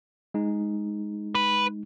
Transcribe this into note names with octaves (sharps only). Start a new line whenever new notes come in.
G#3 D#4
B4